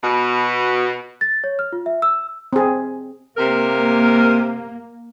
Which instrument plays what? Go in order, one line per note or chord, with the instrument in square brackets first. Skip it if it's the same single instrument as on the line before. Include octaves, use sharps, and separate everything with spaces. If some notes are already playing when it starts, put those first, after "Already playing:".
[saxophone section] B2
[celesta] A6
C#5
F6
F4
E5
E6
[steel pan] C4 G#4
[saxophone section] C3 A#4 [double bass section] A#3